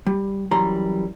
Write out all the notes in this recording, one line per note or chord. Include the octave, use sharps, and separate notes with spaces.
G3
F#2 E3 G3 A#5 C6